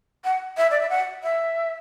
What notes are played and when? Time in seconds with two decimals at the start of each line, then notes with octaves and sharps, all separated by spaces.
0.25 F#5
0.57 E5
0.71 D5
0.80 E5
0.90 F#5
1.23 E5